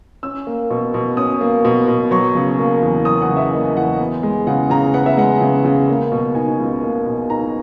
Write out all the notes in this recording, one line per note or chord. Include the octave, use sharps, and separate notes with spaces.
C#4 E6
A#3
B2
B2
C#4 D#6
A#3
B2
B2
F#3 C#6
C#3
A#3
E2
F#3 D#6
F#5
C#3
E5
A#3 D#5
E2 F#5
B3
G#3
C#3 F#5
C#3 A#5
B3 F#5
E5
G#3 F#5
C#3
C#3
A#3
B2
D#4 G#5
C#2
A#3
B2
D#4 A#5